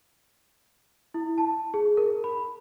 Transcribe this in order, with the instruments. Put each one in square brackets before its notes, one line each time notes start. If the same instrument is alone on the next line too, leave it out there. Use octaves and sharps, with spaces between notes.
[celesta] E4
A5
G#4
A#4
B5